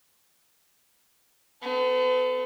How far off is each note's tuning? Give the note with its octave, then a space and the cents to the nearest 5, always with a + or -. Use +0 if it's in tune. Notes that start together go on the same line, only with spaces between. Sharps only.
B3 +45 A4 +0